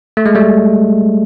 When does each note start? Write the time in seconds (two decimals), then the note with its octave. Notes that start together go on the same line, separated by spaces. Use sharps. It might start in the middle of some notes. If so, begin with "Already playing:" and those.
0.17 A3
0.26 G#3
0.35 G3 A3